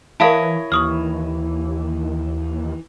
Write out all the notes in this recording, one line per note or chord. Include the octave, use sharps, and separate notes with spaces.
E3 E4 A#4 C#5 D#5 F5 A5
D#2 E3 C#6 D#6 F6